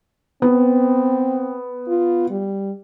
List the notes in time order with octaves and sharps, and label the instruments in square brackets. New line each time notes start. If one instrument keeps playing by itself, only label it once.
[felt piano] B3 [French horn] C4
[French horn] F4
G3